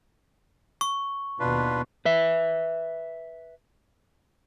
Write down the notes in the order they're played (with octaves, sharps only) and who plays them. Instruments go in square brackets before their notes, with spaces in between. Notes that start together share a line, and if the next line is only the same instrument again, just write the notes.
[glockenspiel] C#6
[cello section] D#2 B2 [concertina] D4 F4 B4
[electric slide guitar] B4 E5